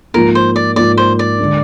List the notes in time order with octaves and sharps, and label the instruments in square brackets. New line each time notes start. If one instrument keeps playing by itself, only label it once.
[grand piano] G#2 F3 A#3 F4 [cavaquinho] A#4
[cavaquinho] C5
D5
[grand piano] G#2 F3 A#3 F4 [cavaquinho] D5
[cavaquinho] C5
D5
[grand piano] D3 G#3 D4